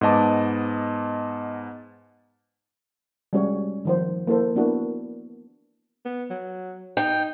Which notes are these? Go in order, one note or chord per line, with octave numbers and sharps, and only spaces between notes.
G#2 B3 D#5 A5 D6
G3 G#3 C#4 F#4 C#5
D#3 F3 C5
A#3 E4 A4 C5
A#3 B3 D4 E4 F#4 A#4
B3
F#3
D#4 G5